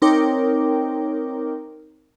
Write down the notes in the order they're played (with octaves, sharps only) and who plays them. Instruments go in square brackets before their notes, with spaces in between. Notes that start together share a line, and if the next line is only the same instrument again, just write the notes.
[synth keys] C4 D#4 A#4 C#5 G5 D6